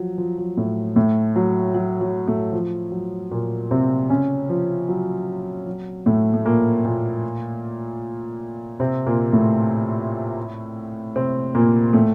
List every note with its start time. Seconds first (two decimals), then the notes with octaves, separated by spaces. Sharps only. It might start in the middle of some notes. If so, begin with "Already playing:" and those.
Already playing: F3 F#3
0.18 F3
0.38 F#3
0.57 A2 A3
0.96 A2 A3
1.36 F#3
1.75 F#3
2.01 F#3
2.27 A2 A3
2.53 F3
2.92 F#3
3.31 A#2 A#3
3.71 C3 C4
4.10 C#3 C#4
4.49 F3
4.89 F#3
5.67 F#3
6.06 A2 A3
6.34 A3
6.45 A#2 A#3
6.85 A#2 A#3
8.80 C3 C4
9.06 A#2 A#3
9.32 A2 A3
11.16 C3 C4
11.55 A#2 A#3
11.93 A2 A3